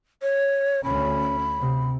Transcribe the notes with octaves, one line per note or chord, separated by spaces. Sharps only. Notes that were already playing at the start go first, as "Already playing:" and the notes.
C#5
D2 C#4 B5
C3